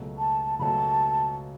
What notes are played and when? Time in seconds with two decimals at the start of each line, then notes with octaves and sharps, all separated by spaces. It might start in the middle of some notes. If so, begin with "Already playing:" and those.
Already playing: C#2 B2 F#3 A3
0.18 A5
0.59 C#2 B2 F#3 A3 A5 B5